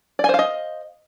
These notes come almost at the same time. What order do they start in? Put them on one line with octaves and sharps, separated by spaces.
D5 G#5 C5 F5 D#5